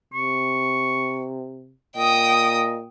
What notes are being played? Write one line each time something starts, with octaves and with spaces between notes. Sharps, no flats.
C3 C#6
A#2 D#5 G5 D#6